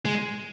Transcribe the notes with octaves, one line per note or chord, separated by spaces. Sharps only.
G#3